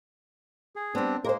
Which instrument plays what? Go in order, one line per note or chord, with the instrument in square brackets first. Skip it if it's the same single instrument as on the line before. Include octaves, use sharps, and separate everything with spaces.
[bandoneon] G#4
[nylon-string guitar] G3 B3 [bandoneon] C4 D4
[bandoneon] G#3 A#3 [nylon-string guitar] A#4 C5